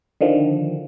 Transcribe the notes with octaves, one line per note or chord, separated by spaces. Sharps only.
D3 D#3 F3